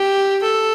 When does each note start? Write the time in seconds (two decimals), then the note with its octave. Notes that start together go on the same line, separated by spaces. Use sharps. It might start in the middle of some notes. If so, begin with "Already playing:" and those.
Already playing: G4
0.43 A4